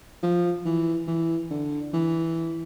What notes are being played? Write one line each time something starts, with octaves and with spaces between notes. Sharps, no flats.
F3
E3
E3
D3
E3